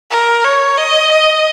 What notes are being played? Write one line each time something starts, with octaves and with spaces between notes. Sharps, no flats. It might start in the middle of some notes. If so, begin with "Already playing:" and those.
A#4
C#5
D#5
D#5